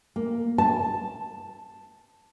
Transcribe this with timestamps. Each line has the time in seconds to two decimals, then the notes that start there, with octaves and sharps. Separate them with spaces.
0.16 A#3
0.58 A5